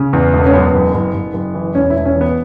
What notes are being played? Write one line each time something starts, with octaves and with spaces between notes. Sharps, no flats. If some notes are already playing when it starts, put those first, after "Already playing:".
Already playing: C#3
E2
E1
C#4
F#2 B3
F#1
F#1
F#1
F#1
E3
E1 C#4
E4
E1
C#4
E3
B3